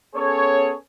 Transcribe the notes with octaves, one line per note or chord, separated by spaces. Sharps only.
B3 C#4 G#4 A4 C#5